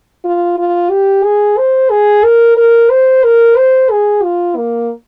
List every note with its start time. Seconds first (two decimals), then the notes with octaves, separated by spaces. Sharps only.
0.25 F4
0.59 F4
0.91 G4
1.25 G#4
1.58 C5
1.91 G#4
2.24 A#4
2.57 A#4
2.90 C5
3.24 A#4
3.57 C5
3.91 G#4
4.23 F4
4.57 A#3